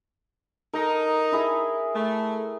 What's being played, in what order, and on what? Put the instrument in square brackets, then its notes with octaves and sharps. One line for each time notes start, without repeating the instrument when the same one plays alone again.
[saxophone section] D#4 [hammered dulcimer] A#4
[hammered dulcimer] E4 G#4
[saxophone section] A3